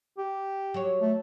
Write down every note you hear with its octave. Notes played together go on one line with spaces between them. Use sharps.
G4
F#3 C#5
A3